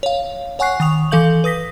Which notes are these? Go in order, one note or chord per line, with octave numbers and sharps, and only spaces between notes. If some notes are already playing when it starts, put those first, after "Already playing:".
C#5 F5
C#5 F#5 G#5 C#6 F#6 C7
D#3 C#6 D#6 F7
E3 A4 F5 G6 F#7
B4 D#6 A#6 B6